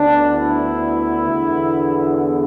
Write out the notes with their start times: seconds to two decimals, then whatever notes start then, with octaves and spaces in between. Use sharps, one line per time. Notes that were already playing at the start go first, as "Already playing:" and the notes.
Already playing: D2 D3 B3 D4
0.34 E4
1.27 E2 D3 B3